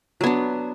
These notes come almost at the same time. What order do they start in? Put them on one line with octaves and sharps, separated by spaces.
F#3 B3 D4